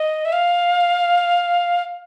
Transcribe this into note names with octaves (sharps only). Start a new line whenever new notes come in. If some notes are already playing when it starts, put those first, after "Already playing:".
Already playing: D#5
E5
F5